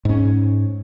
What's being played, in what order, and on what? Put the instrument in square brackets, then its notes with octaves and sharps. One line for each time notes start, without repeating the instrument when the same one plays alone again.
[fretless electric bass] G#2 C#4